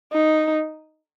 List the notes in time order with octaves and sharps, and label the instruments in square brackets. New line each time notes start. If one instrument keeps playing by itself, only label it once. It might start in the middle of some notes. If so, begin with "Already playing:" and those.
[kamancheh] D#4